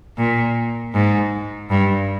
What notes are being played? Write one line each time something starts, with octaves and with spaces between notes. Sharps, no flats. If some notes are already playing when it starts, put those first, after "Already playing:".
A#2
G#2
G2